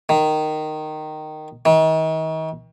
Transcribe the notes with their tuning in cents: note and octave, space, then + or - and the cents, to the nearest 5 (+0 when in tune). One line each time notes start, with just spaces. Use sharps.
D#3 -10
D#3 +40